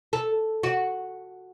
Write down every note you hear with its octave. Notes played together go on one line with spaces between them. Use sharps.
A4
F#4